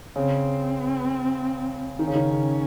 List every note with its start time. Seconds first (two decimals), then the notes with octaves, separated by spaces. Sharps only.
0.16 C#3 C4
1.99 D#3 C#4
2.07 C#3
2.15 D#3
2.30 C#3